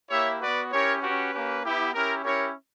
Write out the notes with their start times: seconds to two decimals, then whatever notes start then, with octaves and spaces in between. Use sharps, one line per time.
0.10 A#3 E4 G4 C#5 E5
0.41 B3 F#4 B4 D5
0.72 C#4 E4 G4 A#4 C#5
1.02 C#4 F#4 G4 B4
1.33 A#3 C#4 G4
1.64 B3 E4 G4
1.94 C#4 E4 G4 A#4
2.25 C#4 E4 G4 A#4 C#5